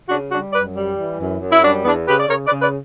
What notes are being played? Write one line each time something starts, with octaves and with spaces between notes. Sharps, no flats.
C#3 D4 F#4
G3 D4 F#4
F#2 B4 D5
G3
E3
F#2
F#2
E4
G3 D4 F#4
E2 B3 D4
C#3 G4 B4
D5
C#3 A#4 C#5
B4 D5
C#3
B4 D5